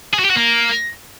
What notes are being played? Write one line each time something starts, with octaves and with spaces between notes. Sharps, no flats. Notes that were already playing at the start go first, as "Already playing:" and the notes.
G#4
F#4
G4
F#4
A#3